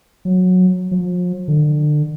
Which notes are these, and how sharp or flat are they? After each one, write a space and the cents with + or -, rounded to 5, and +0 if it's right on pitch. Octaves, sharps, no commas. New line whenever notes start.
F#3 -15
F3 +40
D3 +30